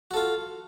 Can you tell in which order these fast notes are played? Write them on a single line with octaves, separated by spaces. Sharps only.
F#4 A4 F4